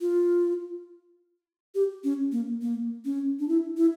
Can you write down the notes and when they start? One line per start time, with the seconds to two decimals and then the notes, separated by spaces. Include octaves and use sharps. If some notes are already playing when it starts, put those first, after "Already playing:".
0.01 F4
1.75 G4
2.04 C#4
2.32 A#3
2.62 A#3
3.05 C#4
3.39 D4
3.49 E4
3.77 E4